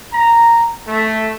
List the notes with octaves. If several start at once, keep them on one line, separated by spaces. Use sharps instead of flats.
A#5
A3